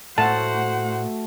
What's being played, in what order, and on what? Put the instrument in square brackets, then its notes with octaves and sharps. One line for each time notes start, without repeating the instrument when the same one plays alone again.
[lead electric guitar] A2 [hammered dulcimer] A3 F#4 [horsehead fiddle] C5 F#5 [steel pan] A5